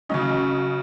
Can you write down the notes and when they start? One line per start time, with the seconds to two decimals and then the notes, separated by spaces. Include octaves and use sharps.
0.09 C#3 F#3 C#4 D#5